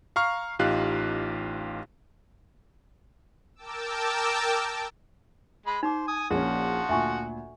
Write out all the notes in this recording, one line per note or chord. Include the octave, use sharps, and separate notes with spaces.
F5 A#5 C#6 F6 C7
A1 D#4 F4 G4 F5 F#6
A#4 G5 A5 D6 E6
G#3 B5
D#4 C5 D6
G#5 D#6
A#1 F3 A#3 C#4 F#4
D2 A#2 E5 G#5 C#6